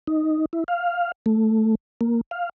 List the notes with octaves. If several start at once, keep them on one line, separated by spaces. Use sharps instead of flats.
D#4
E4
F5
A3
A#3
F5